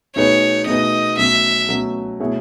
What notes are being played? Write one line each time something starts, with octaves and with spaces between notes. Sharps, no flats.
B2 A3 D#4 G#4 B4 C#5
B2 A3 D#4 G#4 B4 D#5
B2 F#3 A3 C#4 E5
B2 F#3 A3 C#4
B2 A3 E4 G#4 C#5